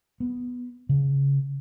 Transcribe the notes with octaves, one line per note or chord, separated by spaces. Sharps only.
B3
C#3